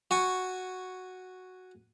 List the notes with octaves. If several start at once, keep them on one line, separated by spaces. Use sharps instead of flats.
F#4 G#5 C#6